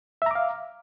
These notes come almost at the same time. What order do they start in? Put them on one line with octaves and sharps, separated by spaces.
E5 A#5 D6 F5